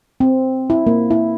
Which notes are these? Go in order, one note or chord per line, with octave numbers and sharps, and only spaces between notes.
C4
E4
A#3
E4